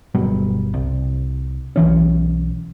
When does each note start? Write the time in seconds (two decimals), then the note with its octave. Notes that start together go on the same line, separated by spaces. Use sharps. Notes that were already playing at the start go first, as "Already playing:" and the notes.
0.15 G1 B2 F#3 G3
0.74 C2
1.76 B1 E3 C#4